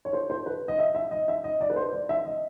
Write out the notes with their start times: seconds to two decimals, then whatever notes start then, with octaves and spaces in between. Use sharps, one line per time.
0.05 C#5
0.13 C5
0.30 C5
0.46 B4
0.68 D#5
0.79 E5
0.95 E5
1.11 D#5
1.28 E5
1.44 D#5
1.61 D5
1.70 B4
1.76 C5
1.93 D5
2.09 E5
2.26 D#5